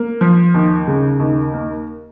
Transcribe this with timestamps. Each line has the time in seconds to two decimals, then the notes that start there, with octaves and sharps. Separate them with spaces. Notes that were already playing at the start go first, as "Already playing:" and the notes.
Already playing: A#3
0.21 F3
0.54 D#2
0.87 C#3
1.20 D#2
1.54 A#3